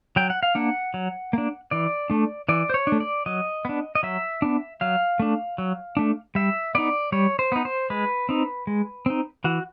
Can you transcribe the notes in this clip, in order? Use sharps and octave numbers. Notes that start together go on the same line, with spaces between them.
F#3 G5
F#5
F5
A#3 D4 F#5
F#3
A#3 D4
E3 D5
A3 D4
E3 D5
C5
C#5
D4
A3
D5
F#3 D#5
B3 D4
D#5
F#3 E5
B3 D4
F#3 F5
A3 D4
F#3
A3 D4
G3 E5
B3 D#4 D5
G3 C#5
C5
B3 D#4
C5
G#3 B4
C4 D#4
G#3
C4 D#4
E3 F#4